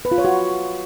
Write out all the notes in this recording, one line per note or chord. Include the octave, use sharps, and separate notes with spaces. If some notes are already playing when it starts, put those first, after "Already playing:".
B4
F4
C#5
F#4